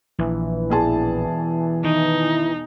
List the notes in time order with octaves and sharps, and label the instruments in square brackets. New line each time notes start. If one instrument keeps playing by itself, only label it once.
[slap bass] A#1 [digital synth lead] E3
[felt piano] E1 G#4 A5
[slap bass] D#3 [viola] D#4